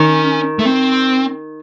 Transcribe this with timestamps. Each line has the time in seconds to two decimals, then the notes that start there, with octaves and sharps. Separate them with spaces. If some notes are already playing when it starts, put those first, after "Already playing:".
Already playing: D#3 C#4
0.59 A3
0.66 C4